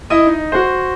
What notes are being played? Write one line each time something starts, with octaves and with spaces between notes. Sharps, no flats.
E4 D#5 D#6
D#4
F#4 C5